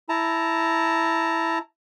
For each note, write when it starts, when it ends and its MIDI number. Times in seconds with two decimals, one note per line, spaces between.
0.09 1.58 64
0.09 1.58 81
0.09 1.58 82